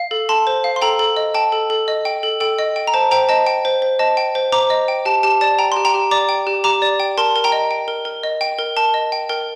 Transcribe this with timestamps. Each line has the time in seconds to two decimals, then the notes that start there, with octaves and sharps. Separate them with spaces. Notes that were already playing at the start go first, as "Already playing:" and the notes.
Already playing: F5
0.11 A4
0.29 A4 A5 C6
0.47 C5
0.64 F5
0.76 C6
0.82 A4 G5 A#5
0.99 A4
1.16 D#5
1.34 G5 A5
1.52 A4
1.70 A4
1.88 D#5
2.05 G5
2.23 A4
2.40 A4 G5
2.59 D#5
2.76 G5
2.87 A#5
2.94 C5 A5
3.11 C5 G5 A#5
3.29 D#5 A5
3.47 G5
3.65 C5
3.82 C5
3.99 D#5 A5
4.17 G5
4.35 C5
4.52 C5 A#5 D6
4.70 D#5
4.88 G5
5.05 G4 A5
5.23 G4 A5
5.41 D5 A5
5.59 G5 A#5
5.72 G4 C6
5.85 G5 A#5
5.94 G4
6.11 D5 A#5 D6
6.29 G5
6.47 G4
6.64 G4 A#5 D6
6.82 D5
7.00 G5
7.18 A#4 A5 C6
7.36 A#4
7.44 G5 A#5
7.52 D#5
7.71 G5
7.88 A#4
8.05 A#4
8.23 D#5
8.41 G5
8.59 A#4
8.76 A#4 A5
8.94 D#5
9.12 G5
9.29 A#4 G5